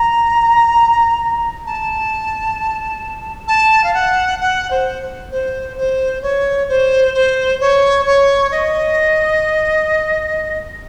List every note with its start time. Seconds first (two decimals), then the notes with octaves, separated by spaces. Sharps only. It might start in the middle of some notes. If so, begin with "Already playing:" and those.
Already playing: A#5
1.66 A5
3.47 A5
3.84 F5
3.93 F#5
4.40 F#5
4.70 C5
5.31 C5
5.77 C5
6.22 C#5
6.68 C5
7.13 C5
7.60 C#5
8.06 C#5
8.51 D#5